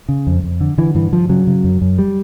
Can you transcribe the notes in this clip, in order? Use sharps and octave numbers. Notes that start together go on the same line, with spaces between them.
C#3
F2
F2
D3
D3 E3
G2 E3
G2 F3
C#3 F#3
C#3
F#2
F#2
G3